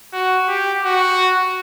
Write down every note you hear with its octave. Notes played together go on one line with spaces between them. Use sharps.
F#4
G4
F#4